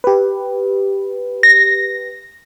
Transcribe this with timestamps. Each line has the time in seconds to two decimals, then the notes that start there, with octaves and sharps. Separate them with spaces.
0.04 G4 B4
1.43 A#6